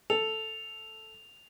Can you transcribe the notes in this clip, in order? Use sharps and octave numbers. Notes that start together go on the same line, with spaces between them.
A4 F7